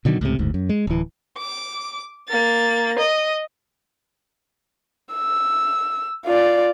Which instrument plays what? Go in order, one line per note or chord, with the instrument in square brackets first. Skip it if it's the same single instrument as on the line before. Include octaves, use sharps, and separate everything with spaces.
[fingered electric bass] B2 D3 D#3 F#3
C#2 A2 C3
F#1 D2 G#2
F#2
G#3
D1 E3
[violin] D6
A#3 A6
D#5
[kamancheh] E6
F4 D5